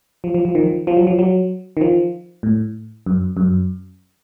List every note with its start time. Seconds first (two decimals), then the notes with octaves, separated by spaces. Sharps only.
0.24 F3
0.34 F3
0.45 F3
0.55 D#3
0.63 F3
0.87 F3
0.97 F#3
1.07 F3
1.19 F#3
1.77 D#3
1.81 F3
2.43 A2
3.06 F#2
3.37 F#2